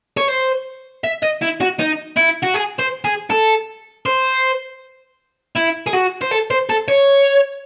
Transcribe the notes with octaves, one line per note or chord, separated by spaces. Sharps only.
C#5
C5
E5
D#5
E4
F#4
D#4
E4
F#4
G#4
C5
G#4
A4
C5
E4
G#4
F#4
C5
A4
C5
A4
C#5